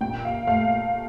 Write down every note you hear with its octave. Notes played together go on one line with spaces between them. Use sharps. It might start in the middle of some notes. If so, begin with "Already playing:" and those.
A#2 G5
F5
A3 F5